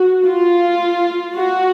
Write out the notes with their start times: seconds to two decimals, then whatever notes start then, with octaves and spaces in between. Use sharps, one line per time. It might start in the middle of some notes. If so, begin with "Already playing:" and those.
Already playing: F#4
0.25 F4
1.36 F#4